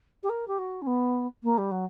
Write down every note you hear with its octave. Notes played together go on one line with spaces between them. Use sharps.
G4
A#4
G4
F#4
C#4
B3
A#3
G3
F#3